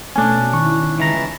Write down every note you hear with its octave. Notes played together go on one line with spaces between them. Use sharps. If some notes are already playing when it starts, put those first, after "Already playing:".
B2 A3 C#4 D4 G#5
D#3 E4 C#6
C#2 E3 A5 A#5 A6